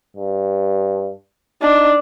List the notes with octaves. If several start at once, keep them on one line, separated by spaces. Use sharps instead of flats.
G2
D4 D#4